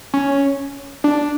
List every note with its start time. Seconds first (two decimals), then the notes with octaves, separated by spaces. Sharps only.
0.14 C#4
1.04 D4